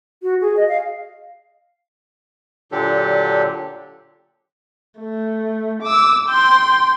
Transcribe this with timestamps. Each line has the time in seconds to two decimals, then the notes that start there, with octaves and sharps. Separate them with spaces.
0.23 F#4
0.41 G#4
0.57 D#5
0.69 F5
2.72 A#2 D3 F#3 D4 G4 A4
4.98 A3
5.83 D6 E6
6.29 G5 C6